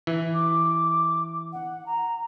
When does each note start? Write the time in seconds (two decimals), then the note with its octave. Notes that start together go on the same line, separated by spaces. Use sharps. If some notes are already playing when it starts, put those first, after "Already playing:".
0.07 E3
0.34 D6
1.52 F#5
1.86 A#5